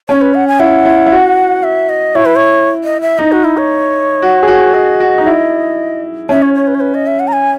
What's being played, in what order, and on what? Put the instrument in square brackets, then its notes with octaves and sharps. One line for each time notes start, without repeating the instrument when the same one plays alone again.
[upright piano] C#4 [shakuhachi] C#5
[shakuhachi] B4
F#5
G#5
[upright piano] E4 [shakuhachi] F#5
[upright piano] E4
E4
F#4
[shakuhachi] E5
D#5
[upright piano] E4 [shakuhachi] C#5
[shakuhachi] B4
C#5
D#5
E5
[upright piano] D#4 [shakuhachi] D#5
[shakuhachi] F#4
E4
C#5
[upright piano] F#4
G#4
F#4
[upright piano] G#4 [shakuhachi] D#5
[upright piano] F#4
D#4
E4
[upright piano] C#4 [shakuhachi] E5
[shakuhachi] C#5
C#5
B4
C#5
B4
D#5
E5
F#5
A#5
G#5